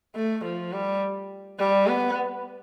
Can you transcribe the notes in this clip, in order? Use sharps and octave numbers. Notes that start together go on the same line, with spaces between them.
A3
F3
G3
G3
B3